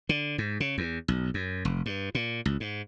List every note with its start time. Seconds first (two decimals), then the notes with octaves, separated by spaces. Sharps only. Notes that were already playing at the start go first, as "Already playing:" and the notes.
0.09 D3
0.38 G#2
0.60 C#3
0.78 E2
1.08 B1
1.34 F#2
1.65 F1
1.86 G2
2.15 A#2
2.46 C#2
2.60 G#2